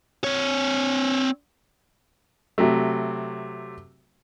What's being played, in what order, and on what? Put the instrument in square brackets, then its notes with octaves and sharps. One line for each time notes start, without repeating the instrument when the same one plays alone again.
[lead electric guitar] C4 C#5
[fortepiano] C3 F#3 A3